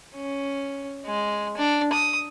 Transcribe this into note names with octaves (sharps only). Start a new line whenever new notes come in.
C#4
G#3
D4
D#6